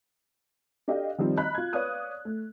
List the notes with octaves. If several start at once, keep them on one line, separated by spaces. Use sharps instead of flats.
D4 G4 A4 D#5 F5 G5
D#3 F3 G3 C4 D4
D#5 A#5 B5 F#6
F4 G#6
B4 C#5 D5 F5 D#6 F#6
A3